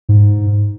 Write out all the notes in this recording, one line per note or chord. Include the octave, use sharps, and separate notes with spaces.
G#2